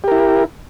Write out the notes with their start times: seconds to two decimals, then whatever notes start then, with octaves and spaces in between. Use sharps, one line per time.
0.04 G4
0.08 A#4
0.12 E4